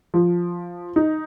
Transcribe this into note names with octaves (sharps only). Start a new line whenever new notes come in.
F3
D#4